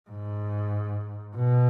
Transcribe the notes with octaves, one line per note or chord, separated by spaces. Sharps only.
G#2
B2